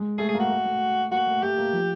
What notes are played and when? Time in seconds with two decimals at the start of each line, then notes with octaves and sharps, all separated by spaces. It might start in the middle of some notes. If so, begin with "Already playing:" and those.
Already playing: G#3
0.18 A3 G#4
0.29 G#4
0.34 A#3
0.40 F#4
0.50 A3
0.65 A3
1.11 A#3 F#4
1.27 A3
1.42 A3 G4
1.58 A#3
1.73 F3